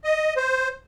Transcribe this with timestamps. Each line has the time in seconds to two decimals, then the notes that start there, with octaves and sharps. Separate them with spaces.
0.04 D#5
0.36 C5